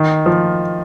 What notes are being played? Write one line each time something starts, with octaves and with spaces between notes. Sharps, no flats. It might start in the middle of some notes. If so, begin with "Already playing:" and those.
Already playing: D#3
F3